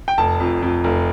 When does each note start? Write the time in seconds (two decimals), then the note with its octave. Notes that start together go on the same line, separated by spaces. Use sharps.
0.08 G5
0.18 F1 A5
0.40 F2
0.62 F2
0.84 F1